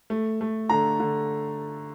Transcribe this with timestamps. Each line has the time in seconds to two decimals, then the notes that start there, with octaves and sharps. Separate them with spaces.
0.10 A3
0.41 A3
0.69 D3 A#5
1.00 D3